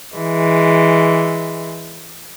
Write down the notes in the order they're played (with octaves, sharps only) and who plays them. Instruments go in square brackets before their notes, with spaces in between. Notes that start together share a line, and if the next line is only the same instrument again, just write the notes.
[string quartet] E3 G#3